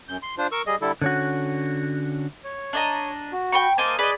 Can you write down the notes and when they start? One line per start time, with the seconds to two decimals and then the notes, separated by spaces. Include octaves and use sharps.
0.08 F#2 G6
0.23 C6
0.38 D4 F4 C5
0.52 A#4 C#6 E6
0.67 G3 G#4 D#5
0.82 D3 G3 E4 A4
1.02 D3 C#4 F#4
2.44 C#5
2.73 D4 D#5 A#5
3.33 F#4
3.52 G5 B5 C#6
3.78 A#3 C5 D#5 G#5 A5 D6
3.99 G#4 B4 D5 D#5 B5